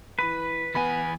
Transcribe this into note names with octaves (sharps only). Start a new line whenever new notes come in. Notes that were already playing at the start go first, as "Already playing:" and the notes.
E3 B4 B5 D#7
E2 B3 G#5 B5